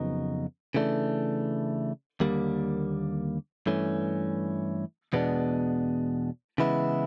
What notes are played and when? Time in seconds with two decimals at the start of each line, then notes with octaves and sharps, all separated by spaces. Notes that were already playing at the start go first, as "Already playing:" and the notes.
Already playing: F2 C#3 F#3 B3 D#4
0.74 C#3 E3 A3 D4
2.20 D#2 D3 G3 A#3
3.66 G2 E3 A3 C#4
5.13 E2 B2 G#3 B3 D4
6.58 C#3 E3 G#3 B3 E4